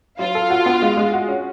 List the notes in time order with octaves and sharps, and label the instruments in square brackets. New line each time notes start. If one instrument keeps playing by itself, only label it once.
[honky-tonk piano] F#3 [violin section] F4 F5
[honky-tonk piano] A4
F#4
B3
G#3
G#3
F#4
C#4